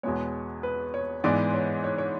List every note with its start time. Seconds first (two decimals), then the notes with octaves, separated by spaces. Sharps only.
0.03 E2 B2 G#3 B3 C#5
0.63 B4
0.94 C#5
1.24 G#2 E3 G#3 B3 D5
1.54 C#5
1.84 C#5
1.98 C#5